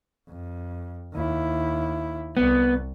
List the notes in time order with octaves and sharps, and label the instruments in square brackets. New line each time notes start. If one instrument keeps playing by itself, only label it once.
[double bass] F2
D#2 E4
[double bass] C2 [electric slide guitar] B3